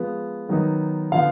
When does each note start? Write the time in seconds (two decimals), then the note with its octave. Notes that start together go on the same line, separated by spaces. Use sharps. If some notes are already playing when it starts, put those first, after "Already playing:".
Already playing: F3 G#3 B3
0.49 D#3 F#3 B3 D#4
1.12 D3 F3 B3 F5